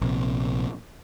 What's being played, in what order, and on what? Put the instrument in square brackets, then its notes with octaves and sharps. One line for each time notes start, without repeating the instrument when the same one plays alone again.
[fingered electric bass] A#1 C3